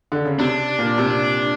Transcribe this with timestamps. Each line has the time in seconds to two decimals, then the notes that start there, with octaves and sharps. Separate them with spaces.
0.12 D3
0.25 C#3
0.39 C3 D4
0.79 A#2
0.98 C3